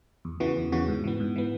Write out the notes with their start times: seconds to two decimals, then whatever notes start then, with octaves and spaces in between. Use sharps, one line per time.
0.25 E2
0.40 C#3 E3 B3 F#4
0.57 E2
0.72 C#3 E3 B3 F#4
0.88 G#2
1.04 E3 B3
1.20 G#2
1.36 E3 B3